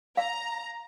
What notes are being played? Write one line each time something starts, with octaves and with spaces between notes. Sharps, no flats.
F5 A#5